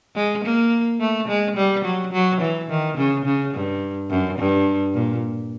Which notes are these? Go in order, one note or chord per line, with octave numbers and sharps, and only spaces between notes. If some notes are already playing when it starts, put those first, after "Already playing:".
G#3
A#3
A3
G#3
G3
F#3
F#3
E3
D#3
C#3
C#3
G2
F#2
G2
A#2